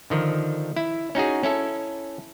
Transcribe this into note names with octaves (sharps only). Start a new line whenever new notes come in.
D3 D#3 F3
E4
C#4 D#4 F#4 G#4
C#4 E4 A4